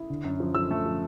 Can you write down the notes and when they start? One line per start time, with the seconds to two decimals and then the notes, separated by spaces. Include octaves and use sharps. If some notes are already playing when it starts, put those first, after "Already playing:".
Already playing: E4 D#6
0.10 D3
0.24 F#2
0.40 F3
0.55 F3 E6
0.71 A3
0.86 F3